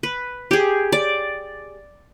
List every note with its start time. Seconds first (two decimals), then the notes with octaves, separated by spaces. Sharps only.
0.03 B4
0.51 G4 G#4
0.92 D5